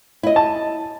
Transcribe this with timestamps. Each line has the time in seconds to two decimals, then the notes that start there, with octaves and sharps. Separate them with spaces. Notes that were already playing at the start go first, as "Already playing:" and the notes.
0.23 E4 D#5
0.36 A5